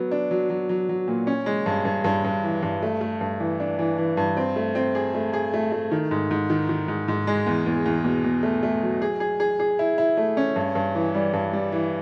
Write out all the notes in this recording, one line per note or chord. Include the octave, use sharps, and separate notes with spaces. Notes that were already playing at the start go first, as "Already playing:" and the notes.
Already playing: F#3 B3
D4
F#3
F#3
F#3
F#3
A#2
C#4
G#3
G2
G2
G2
G2
E3
G2
A3
A3
G2
E3
D4
E3
E3
G2
C4
A3
C4
G#4
A3
G#4
A3
A3
D#3
G#2
G#2
D#3
D#3
G#2
G#2
G#3
E2
E2
E2
B2
B2
A3
A3
F#3
G#4
G#4
G#4
G#4
E4
E4
A3
C#4
G2
G2
E3
G3
G2
G3
E3